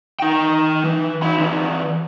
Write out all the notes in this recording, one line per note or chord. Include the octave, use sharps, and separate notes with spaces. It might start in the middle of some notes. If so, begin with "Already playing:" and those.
D#4 G5
E3
D#4 B5
E3 C4